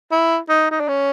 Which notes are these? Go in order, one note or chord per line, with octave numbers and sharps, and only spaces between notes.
E4
D#4
D#4
D4
C#4